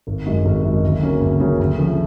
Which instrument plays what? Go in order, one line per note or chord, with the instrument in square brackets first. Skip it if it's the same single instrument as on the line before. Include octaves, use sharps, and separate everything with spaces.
[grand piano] G#1
F#2 D#3 G#3
G#1
F#2 D#3 G#3
D2
C#3 F#3 A#3 C#4
D2
C#3 F#3 A#3 C#4
D2
C#3 F3 A3